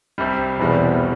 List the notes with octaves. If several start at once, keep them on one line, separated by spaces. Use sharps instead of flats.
C2 C3 G3
B1 E2 B2 G3 C4